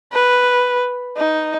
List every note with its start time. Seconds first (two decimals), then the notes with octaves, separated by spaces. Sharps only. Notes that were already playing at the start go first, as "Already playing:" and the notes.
0.13 B4
1.17 D#4